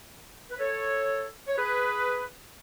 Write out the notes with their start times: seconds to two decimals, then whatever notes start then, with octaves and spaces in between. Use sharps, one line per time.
0.50 B4
0.59 A4 C#5
1.48 C#5
1.57 G#4 B4